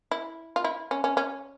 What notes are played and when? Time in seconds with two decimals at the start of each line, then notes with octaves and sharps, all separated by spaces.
0.11 E4
0.56 F4
0.64 E4
0.91 C#4
1.04 C#4
1.17 C#4